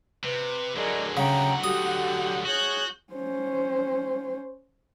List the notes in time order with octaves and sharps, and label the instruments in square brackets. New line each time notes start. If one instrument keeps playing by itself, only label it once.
[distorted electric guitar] C3 [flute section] B4
[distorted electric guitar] D3 F#3 [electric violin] G#4 A#4 [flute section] D5 D#5
[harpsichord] C#3 [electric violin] F#5 [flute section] G5 A#5
[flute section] F#4 G4 A4 [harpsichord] D#6
[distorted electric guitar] F#4 [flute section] G#4 C#5 [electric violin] F#6 G6
[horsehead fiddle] C#4 C5